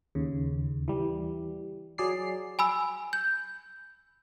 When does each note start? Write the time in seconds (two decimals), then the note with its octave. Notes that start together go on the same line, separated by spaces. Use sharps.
0.15 D#2 C#3
0.88 E3 G3
1.98 F#3 G#4 D5 C7
2.59 G#5 B5 E6
3.13 G6